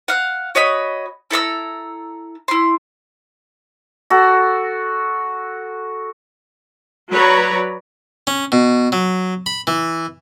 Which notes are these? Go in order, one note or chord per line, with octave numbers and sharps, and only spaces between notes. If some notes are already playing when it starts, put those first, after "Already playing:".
F5 F#5
F#4 C#5 D#5 B5
E4 A4 A#5 E6
E4 C6
F#4 A4
F#3 B4 C#5 D5 A#5
C#4
B2
F#3
B5
E3